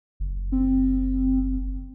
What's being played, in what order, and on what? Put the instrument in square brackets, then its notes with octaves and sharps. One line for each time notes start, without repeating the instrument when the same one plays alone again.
[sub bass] F#1
[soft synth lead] C4